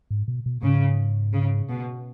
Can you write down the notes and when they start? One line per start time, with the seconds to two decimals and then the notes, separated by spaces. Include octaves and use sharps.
0.11 G#2
0.28 B2
0.46 B2
0.63 G#2 C#3
1.33 C#3
1.69 B2